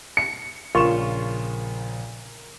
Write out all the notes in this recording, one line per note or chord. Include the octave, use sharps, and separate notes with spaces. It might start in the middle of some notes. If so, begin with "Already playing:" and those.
C#7
A#1 C#3 F4 A#4 C#6 E7